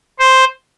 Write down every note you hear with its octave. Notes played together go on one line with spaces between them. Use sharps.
C5